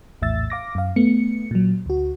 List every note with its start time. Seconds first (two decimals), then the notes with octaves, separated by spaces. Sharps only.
0.22 A#1 E2 A2 E5 E6 A6
0.50 F5 D6 A#6
0.75 F#2 F5
0.96 A3 B3 C#7
1.51 A#2 F#3
1.86 D2 F#4